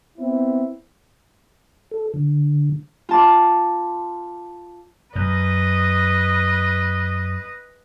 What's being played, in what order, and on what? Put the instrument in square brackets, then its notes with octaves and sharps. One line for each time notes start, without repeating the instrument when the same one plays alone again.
[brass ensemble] B3 C4 E4
[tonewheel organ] A4
D3
[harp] F4 A5 D6
[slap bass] F#2 [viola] B4 D#5